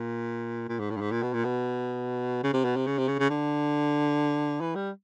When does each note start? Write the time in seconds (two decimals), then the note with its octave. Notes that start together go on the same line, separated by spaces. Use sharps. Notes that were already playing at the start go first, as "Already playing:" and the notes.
Already playing: A#2
0.69 A#2
0.79 G#2
0.90 A2
0.96 G2
1.01 G#2
1.12 A#2
1.23 B2
1.34 A#2
1.45 B2
2.44 C#3
2.54 C3
2.65 B2
2.76 C3
2.87 C#3
2.98 C3
3.08 C#3
3.19 C#3
3.30 D3
4.61 E3
4.75 G3